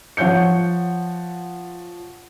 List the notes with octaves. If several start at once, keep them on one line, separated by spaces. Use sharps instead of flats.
F3 C#5 F#5 G6 C#7